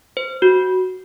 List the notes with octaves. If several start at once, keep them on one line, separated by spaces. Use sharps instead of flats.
C5
F#4